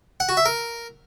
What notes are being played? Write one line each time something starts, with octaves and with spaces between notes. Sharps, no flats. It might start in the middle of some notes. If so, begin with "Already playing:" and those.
F#5
F#4
E5
A#4